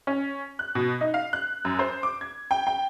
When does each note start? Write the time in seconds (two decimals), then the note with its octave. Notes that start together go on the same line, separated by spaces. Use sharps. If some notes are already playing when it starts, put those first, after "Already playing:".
0.07 C#4
0.59 F#6
0.75 B2
1.01 D#4
1.14 F5
1.33 F#6
1.65 F#2
1.79 C5
2.03 D6
2.21 G#6
2.51 G5
2.67 G5